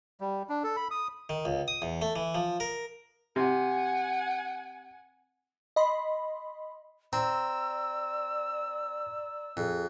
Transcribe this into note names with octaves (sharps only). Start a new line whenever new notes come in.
G3
D4
A4
B5
D#6
D#3
C#2
D#6
E2
A3
E3
F3
A#4
C3 F#5 G#5
D#5 B5 C6
C4 D5 A#5 C6 E6
F2 G#4